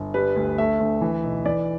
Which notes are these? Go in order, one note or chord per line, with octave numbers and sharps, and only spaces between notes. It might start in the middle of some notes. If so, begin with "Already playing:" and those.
Already playing: G1
G3 B4
D2
A3 E5
D2
E3
B1
E3 D5